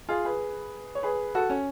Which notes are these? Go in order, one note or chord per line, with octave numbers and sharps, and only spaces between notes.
F4 G#4
G#4 B4
C#5
G#4 B4
F#4 A4
C#4